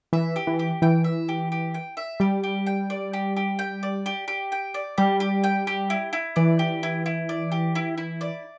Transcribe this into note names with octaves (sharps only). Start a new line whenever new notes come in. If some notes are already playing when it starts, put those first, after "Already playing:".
E3 E5
G4
E3
G4
E3 G5
E5
G4
G4
G5
E5
G3 G4
G4
G5
D5
G4
G4
G5
D5
G4
G4
G5
D5
G3 G4
G4
G5
G4
E4
E4
E3 D5
G4
E4
E4
D5
G4
E4
E4
D5